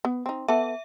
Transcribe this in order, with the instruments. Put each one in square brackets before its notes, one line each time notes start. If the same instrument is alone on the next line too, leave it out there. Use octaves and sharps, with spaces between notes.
[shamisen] B3
C4 D#4
[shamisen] B3 A4 [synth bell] E5